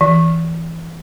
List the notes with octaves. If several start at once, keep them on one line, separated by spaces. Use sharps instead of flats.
E3